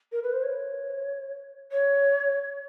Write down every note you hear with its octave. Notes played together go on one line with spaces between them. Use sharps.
A#4
B4
C5
C#5
C#5